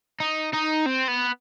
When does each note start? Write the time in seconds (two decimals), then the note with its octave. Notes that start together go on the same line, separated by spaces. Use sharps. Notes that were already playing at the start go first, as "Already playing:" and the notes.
0.20 D#4
0.53 D#4
0.86 C4
1.08 B3